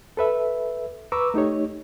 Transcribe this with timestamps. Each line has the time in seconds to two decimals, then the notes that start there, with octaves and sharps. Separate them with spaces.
0.17 A4 B4 E5
1.12 B4 A#5 C#6 D6 E6
1.34 A3 D#4 G4 C#5